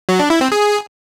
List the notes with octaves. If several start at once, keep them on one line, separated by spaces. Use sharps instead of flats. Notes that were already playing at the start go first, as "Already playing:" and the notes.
F#3
D4
E4
C4
G#4